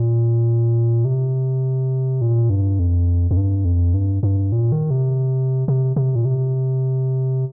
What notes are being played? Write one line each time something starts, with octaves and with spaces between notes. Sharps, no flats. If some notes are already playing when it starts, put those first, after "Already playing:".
Already playing: A#2
C3
A#2
G2
F2
F2
G2
F2
G2
G2
A#2
D#3
C3
C3
C3
A#2
C3